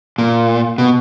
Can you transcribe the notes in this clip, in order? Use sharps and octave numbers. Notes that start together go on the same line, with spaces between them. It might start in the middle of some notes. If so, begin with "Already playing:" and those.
A#2
B2